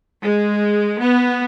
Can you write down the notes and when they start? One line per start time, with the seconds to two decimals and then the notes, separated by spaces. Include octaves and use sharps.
0.22 G#3
1.02 B3